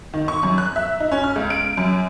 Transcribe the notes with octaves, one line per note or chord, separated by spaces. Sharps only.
D#3
C#6
F#2
F#6
E5
D#4
C#4
F6
C#2
D7
F#2